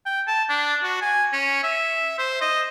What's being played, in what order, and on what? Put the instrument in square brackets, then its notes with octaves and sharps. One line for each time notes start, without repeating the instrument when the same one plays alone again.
[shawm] G5
A5
D4
F#4
G#5
C#4
E5
C5
D#5